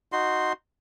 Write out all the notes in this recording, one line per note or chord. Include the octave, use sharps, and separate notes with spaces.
D#4 F#4 C6